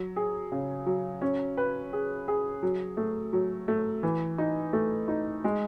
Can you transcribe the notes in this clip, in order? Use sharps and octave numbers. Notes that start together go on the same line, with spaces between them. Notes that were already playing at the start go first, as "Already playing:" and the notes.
Already playing: F#3
G#4
C#3
F#3
C#4
B4
G#4
G#4
F#3
A3
F#3
A3
E3
D#4
A3
D#4
G#3